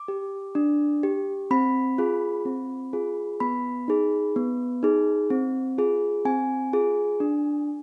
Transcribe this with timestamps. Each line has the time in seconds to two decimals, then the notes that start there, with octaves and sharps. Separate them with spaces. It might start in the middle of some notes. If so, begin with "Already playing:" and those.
Already playing: D6
0.08 G4
0.55 D4
1.03 G4
1.51 C4 B5
1.98 F4 G#4
2.45 C4
2.93 F4 G#4
3.40 B3 B5
3.88 D#4 G#4
4.36 B3
4.83 D#4 G#4
5.30 C4
5.78 F4 G#4
6.25 C4 G#5
6.73 F4 G#4
7.20 D4